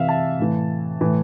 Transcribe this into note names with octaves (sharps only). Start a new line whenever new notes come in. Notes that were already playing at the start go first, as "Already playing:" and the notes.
Already playing: C3 E3 E5 F5
A5
A2 E3
A2 E3